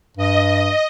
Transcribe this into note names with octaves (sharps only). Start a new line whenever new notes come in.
G2 D#5